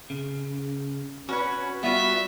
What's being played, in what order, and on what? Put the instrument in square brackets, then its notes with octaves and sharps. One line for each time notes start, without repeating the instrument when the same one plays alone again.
[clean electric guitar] C#3
[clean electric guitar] C#4 [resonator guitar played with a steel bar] F#4 C#5 [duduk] B4
[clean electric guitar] G3 [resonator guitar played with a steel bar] B3 F4 [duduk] F#4 [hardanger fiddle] E5